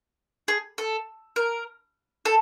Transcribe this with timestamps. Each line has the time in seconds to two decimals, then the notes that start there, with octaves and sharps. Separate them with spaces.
0.48 G#4
0.78 A4
1.36 A#4
2.25 A4